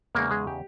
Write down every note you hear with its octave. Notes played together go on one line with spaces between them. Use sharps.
E2 C#3 G#3 A#3 D#4 A#4
G#3 G#4
G4